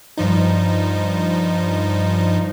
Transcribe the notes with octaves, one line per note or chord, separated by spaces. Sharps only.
G2 F3 D#4